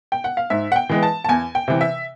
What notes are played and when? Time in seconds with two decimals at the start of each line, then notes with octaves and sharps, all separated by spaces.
0.12 G5
0.24 F#5
0.37 F5
0.50 G#2 E5
0.72 F#5
0.76 G5
0.89 E3 G#3 B3
1.03 A5
1.24 A5
1.29 E2 G#5
1.55 G5
1.68 C3 E3
1.81 E5